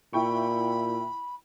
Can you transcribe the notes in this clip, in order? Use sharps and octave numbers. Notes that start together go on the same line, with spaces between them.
A#2 E4 G5 B5 C#6